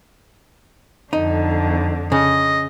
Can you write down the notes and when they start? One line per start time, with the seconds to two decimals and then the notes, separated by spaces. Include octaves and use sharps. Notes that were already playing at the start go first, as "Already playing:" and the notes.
1.13 F2 D3 D#4
2.12 C#3 D#5